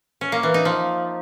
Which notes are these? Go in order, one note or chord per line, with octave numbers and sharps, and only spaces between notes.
C#4
A#3
E3
D#4
F3